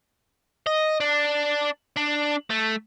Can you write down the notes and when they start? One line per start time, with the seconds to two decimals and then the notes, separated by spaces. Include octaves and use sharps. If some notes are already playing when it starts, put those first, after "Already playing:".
0.67 D#5
1.01 D4
1.97 D4
2.50 A3